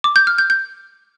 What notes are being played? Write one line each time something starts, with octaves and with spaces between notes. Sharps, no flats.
D6
G6
F6
G6
G6